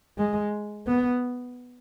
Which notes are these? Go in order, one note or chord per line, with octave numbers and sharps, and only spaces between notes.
G#3
B3